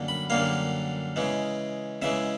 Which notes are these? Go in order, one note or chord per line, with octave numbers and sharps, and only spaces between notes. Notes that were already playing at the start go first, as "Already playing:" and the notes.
Already playing: F#2 D3 G3 A#3
B5
F#2 D3 G3 A#3 F5
C#3 E3 G#3
C#3 E3 G#3 E5